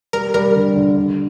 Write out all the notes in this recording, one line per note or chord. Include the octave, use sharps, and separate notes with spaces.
G3 A#4
G3 A#4
D3
D3
D3